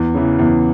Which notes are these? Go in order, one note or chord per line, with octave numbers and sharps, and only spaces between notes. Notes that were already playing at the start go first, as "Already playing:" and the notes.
Already playing: E2
C#3 E3
E2